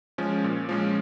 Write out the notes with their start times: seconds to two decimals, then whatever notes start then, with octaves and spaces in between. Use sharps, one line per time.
0.18 F3 G#3 C#4
0.44 A#2
0.69 F3 G#3 C#4